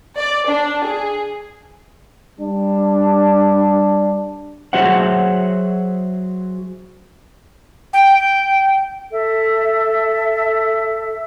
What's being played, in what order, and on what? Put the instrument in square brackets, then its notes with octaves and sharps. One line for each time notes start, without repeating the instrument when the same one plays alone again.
[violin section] D5
D4
G#4
[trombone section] G3 D4
[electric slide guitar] F#3 F#4 G#4 C5 E5 F#5
[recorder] G5
[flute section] A4 E5